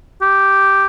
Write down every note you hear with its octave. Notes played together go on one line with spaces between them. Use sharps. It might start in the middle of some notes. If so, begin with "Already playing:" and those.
G4